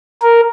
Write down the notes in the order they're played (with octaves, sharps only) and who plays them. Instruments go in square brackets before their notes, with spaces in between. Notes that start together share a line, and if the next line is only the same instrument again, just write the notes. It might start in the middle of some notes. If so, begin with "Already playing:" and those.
[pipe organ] A#4